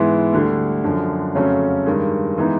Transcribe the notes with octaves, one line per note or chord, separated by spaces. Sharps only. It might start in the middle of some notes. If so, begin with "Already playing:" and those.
Already playing: G#2 E3 G#3 B3 E4
D2 D3 G3
F#2 D3 F3
F2 C#3 F#3 A3 C#4
G2 D#3 G#3
E3 G#3 B3 D#4